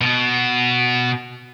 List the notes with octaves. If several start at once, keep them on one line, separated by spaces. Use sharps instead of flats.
B2 B3